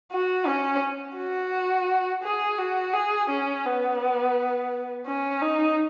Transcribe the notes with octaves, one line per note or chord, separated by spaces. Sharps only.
F#4
C#4
F#4
G#4
F#4
G#4
C#4
B3
C#4
D#4